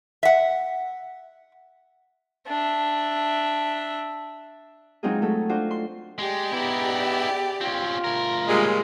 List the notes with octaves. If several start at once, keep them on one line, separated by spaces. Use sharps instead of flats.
E5 F#5
D4 E5
F#3 G#3 C4 D#4 F4 G#4
F#3 A3 A4
D4 F4 F#4 C5
C6
G#3 G4 G#4 D5
B3 D#4 E4
C4 C#4 F4
D2 A#4
A#2 G3 G#3 B4 C#5